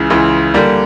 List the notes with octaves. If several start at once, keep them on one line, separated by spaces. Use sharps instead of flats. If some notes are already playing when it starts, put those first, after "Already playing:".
Already playing: C#2 C#3 E3
C#2 C#3 E3
D3 G3 A#3